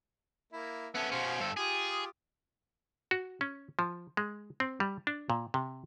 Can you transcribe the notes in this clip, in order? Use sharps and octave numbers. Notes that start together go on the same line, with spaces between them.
A#3 E4
B3 C#4 A4 E5
B2 C#4 C5 F5
G2 A4
F4 G4 G#4 D#6
F#4
C#4
F3
G#3
C4
G3
D4
A#2
C3